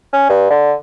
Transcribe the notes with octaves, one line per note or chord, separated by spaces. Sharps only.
C#4
G2
D3